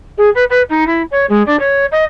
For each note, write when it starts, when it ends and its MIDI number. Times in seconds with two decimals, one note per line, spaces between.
0.18 0.29 68
0.34 0.44 71
0.49 0.62 71
0.69 0.86 63
0.86 1.02 64
1.11 1.25 73
1.29 1.42 56
1.46 1.58 62
1.59 1.85 73
1.91 2.04 75